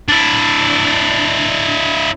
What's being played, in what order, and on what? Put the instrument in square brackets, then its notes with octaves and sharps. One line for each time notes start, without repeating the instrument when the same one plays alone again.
[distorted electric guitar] D4 E4